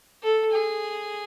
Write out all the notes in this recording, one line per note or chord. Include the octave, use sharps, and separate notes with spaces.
A4
G#4